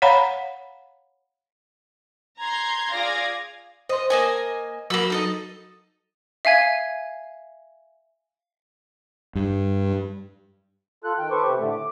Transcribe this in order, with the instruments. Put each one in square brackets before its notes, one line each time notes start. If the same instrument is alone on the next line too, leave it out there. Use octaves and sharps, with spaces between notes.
[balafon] C#5 F5 F#5 A#5 B5
[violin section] A#5 C6 G6 G#6
F4 G#4 D5 F5 G#6 A#6
[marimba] C5 C6 [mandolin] D#5
[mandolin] A#3 D#5 G#5
[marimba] F#3 F#4 [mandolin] A#3 B5 E6
[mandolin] D#4 A4 D#5
[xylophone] E5 F5 G#5 G#6
[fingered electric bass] G2
[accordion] F4 A4 F#6
D#3 G5
A4 B4 C5 C#6 D6
C3 G4
A2 D3 A3
D6